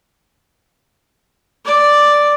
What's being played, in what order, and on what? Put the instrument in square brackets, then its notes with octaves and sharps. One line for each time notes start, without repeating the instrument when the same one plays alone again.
[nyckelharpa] D5